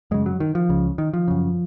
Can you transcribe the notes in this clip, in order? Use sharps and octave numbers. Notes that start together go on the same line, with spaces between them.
F#2 C#3 G#3
F#3
D#3
F3
C#2 C#3
D#3
F3
F#2 C#3